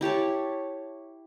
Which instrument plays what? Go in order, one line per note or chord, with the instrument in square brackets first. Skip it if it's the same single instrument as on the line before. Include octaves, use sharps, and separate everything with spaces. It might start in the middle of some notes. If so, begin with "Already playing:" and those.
[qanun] E4 G4 C#5 A5